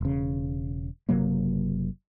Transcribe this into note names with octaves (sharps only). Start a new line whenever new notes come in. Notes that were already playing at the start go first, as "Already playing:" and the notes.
E1 C#3
F#1 C3 F#3 A#3